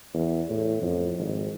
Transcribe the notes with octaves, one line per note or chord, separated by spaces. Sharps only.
E2
A2
F2
G#1